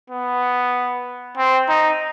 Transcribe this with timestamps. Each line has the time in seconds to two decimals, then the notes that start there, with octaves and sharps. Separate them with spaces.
0.10 B3
1.37 C4
1.69 D#4